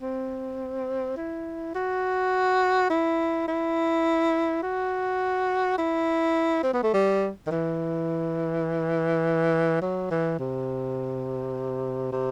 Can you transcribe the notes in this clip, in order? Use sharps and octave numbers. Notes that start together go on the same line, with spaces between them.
C4
E4
F#4
E4
E4
F#4
E4
C4
B3
A3
G3
D#3
E3
F#3
E3
C3
C3